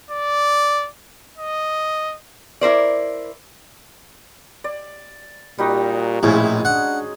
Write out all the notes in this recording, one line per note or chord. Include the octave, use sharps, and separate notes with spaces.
D5
D#5
E4 A#4 C5 D5
D5
A#2 G3 D#4 F#4
A#1 A2 G#3 C#4 E4 G#4
D4 F#5